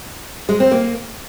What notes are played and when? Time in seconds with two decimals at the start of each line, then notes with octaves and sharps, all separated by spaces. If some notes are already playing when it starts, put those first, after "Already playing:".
0.49 G#3
0.60 C4
0.71 A#3